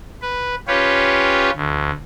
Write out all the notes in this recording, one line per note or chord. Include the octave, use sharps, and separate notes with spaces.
B4
C#4 F4 G4 B4 C#5
D2